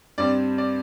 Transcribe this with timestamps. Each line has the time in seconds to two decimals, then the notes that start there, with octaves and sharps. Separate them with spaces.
0.18 G2 G3 C4 D5
0.58 D5